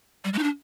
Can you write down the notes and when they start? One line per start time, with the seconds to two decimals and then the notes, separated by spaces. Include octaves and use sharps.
0.25 G3
0.33 G#3
0.39 D#4
0.43 D4